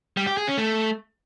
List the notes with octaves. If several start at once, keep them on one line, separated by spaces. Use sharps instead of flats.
G3
G4
G#4
C#4
A3